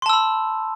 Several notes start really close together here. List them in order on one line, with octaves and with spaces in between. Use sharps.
C6 A5 E6 B5